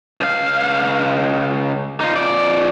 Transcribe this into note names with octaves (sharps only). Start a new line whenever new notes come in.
C#2 F5
D#4 F4
F2 D5